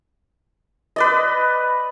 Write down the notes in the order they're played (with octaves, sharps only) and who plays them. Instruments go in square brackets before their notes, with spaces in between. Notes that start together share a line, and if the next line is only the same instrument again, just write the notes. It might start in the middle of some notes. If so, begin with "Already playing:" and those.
[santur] B4 D5 D#5